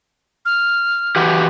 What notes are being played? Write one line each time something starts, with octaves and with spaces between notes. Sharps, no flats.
F6
E3 F#4 G4